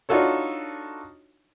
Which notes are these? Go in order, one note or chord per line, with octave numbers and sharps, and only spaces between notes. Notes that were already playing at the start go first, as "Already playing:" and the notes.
D4 D#4 F4 F#4 A4 C#5